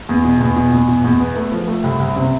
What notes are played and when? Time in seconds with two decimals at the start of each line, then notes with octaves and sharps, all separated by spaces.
0.09 E2
0.25 B2
0.41 E2
0.56 B2
0.72 E2
0.88 B2
1.04 E2
1.20 B3
1.36 A3
1.52 F3
1.68 A3
1.84 C2
1.99 C2
2.16 C3